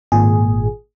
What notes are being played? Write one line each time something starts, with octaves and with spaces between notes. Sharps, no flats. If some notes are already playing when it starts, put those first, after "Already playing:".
G#1 A#2 G#4